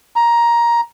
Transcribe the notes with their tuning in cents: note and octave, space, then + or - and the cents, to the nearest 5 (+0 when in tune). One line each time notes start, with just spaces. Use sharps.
A#5 +15